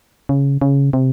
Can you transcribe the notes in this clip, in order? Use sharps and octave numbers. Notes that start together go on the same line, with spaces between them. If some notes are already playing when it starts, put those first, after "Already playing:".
C#3
C#3
C3